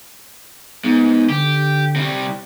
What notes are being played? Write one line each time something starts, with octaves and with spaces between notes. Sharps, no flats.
G#2 B3
D3 G4
C3 G3